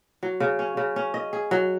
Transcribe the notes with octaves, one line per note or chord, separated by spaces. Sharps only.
F#3
C#3
C#4
C#3
C#4
D#5
G#4
F#3